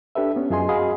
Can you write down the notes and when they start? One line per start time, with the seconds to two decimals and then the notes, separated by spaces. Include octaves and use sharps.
0.15 D4 G4 A4 B4 E5
0.36 B3 C#4
0.50 F#2 F4 G#4 D#5 G#5 C6
0.69 F#4 G#4 D#5 F5 B5